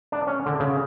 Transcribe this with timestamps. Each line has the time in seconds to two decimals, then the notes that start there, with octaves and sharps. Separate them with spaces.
0.12 D4
0.27 C#4
0.46 D3
0.60 C#3